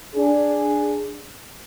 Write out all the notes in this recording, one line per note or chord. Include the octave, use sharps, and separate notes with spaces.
D4 G#4